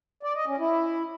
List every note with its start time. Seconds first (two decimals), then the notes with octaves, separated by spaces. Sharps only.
0.23 D5
0.35 D#5
0.47 C#4
0.59 E4